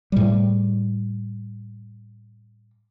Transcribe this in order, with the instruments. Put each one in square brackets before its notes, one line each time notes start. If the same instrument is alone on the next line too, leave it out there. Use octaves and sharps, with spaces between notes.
[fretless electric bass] A2 G3